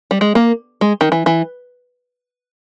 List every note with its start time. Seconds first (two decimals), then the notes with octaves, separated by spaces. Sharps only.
0.11 G3
0.21 G#3
0.35 A#3
0.81 G#3
1.01 D#3
1.12 E3
1.26 E3